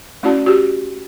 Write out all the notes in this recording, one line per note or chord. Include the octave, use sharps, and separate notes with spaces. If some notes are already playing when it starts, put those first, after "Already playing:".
A3 C#4 E4 F#4 D5 A5
F#4 G4